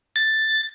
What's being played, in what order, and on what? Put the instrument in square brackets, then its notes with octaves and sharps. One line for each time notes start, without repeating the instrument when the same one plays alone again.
[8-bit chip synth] A6